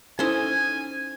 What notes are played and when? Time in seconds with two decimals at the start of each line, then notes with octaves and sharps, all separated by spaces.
0.19 C#4 D#4 E4 A4 C5 G#5